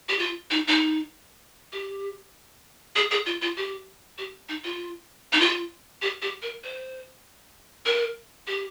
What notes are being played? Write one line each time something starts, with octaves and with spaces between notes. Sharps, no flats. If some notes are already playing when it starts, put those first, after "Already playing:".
G4
F4
D#4
D#4
G4
G#4
G#4
F4
F4
G4
G4
D#4
F4
D#4
F4
G4
G4
A#4
C5
A#4
G4